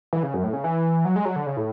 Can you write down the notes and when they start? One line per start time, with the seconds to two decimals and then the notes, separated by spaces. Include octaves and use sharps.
0.13 E3
0.23 C#3
0.34 F#2
0.44 A2
0.53 C#3
0.64 E3
1.05 F#3
1.16 G#3
1.25 F#3
1.36 D3
1.46 C#3
1.57 A2